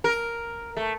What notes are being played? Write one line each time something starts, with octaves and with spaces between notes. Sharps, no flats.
A#4
A3